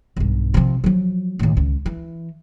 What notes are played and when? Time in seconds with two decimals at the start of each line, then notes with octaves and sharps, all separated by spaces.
0.17 B1 G2
0.54 C3 F3
0.84 F3 F#3
1.39 D#2 A2
1.57 C#2
1.86 E3